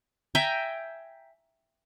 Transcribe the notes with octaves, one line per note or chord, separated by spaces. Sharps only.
E5 G5 G#5 A#5